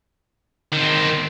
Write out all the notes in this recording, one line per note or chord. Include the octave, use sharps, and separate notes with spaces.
D#3 C4